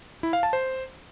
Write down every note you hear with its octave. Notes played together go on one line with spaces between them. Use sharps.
E4
F5
A5
C5